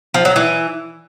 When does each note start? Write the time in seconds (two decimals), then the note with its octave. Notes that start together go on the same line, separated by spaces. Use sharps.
0.14 F3
0.25 F#3
0.36 E3